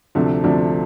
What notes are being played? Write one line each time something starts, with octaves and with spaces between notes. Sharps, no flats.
D2 C3 F3 A3 D4
D2 C3 F3 A3 D4